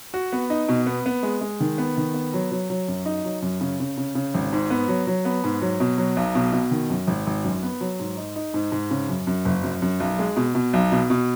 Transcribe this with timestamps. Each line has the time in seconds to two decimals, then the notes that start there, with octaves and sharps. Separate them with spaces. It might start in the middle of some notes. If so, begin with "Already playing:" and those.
0.14 F#4
0.32 B3
0.50 D#4
0.69 B2
0.86 B3
1.06 B3
1.23 G#3
1.41 G#3
1.60 D#3
1.78 B3
1.97 D#3
2.14 B3
2.34 F#3
2.51 F#3
2.70 F#3
2.88 F#2
3.06 D#4
3.25 F#3
3.42 F#2
3.61 C#3
3.80 C#3
3.97 C#3
4.15 C#3
4.34 G#1
4.53 G#2
4.70 B3
4.88 F#3
5.07 F#3
5.25 B3
5.44 G#2
5.62 F#3
5.80 B2
5.98 F#3
6.17 B1
6.35 B2
6.53 B2
6.71 D#3
6.90 F#2
7.07 G#1
7.27 G#1
7.44 F#2
7.63 B3
7.81 F#3
8.00 G#2
8.17 D#4
8.36 D#4
8.54 G#2
8.72 G#2
8.91 C#3
9.09 F#2
9.27 F#2
9.45 F#1
9.63 F#2
9.82 F#2
10.00 B1
10.19 G#3
10.36 B2
10.55 B2
10.73 B1
10.92 B2
11.10 B2